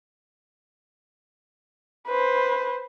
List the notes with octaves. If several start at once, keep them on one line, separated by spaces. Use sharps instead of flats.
B4 C5